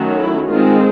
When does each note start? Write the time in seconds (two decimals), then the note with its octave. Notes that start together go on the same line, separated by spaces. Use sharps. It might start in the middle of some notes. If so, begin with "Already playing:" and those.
Already playing: D#3 F#3 A3 C#4
0.18 E4
0.49 D#3 G#3 C4 F4